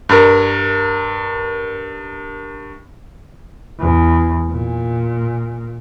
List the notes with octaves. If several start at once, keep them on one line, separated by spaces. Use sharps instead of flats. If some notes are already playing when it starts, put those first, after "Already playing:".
G2 A#4
E2
A#2